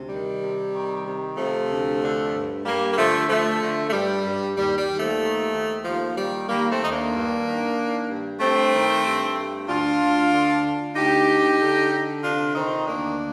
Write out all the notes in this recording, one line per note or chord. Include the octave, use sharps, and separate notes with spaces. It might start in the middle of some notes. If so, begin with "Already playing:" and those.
Already playing: D2 C3
D#3 G3
C3
D#3
C3
C3 F3 A3
D2
D3
G2
G2 G3 A#3
A#3
D3 F3 A3
D3 F3 A3
D3
A3
G2 G3
G2
D#2 G3
G3
D#2
F3 A3
D#3
D#2
D#2 F3
D#3 G3
D#3 G3 A#3
A3 C4
D#2 D#4
A#3 D4
G2
D#3
D#3
G2
G2 A3 C4
D#3
G2
G2
D2 D4 F4
D2
D3
D3
D2 D#4 G4
D3
D3
D3
C3 D4 F4
D#3 C4 D#4
D2 A#3 D4